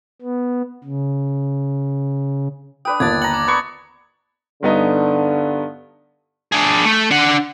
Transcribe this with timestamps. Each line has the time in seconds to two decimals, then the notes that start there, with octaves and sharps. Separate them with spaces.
0.22 B3
0.84 C#3
2.85 D4 B4 G5 D#6
3.00 G1 D#2 D4 D6 G#6 A6
3.22 F#5 A#5 F#7
3.34 D6
3.47 B3 C#6
4.63 G2 D3 B3 D#4
6.52 D4 G#4
6.85 A3
7.11 D4 F#5